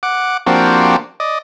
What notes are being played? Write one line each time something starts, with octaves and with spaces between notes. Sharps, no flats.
F#5 D6
F3 A#3 C4 D4 F#4 G4
D5 D#5